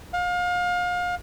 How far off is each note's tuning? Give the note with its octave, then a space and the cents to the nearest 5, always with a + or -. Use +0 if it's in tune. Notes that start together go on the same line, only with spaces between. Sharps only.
F5 +35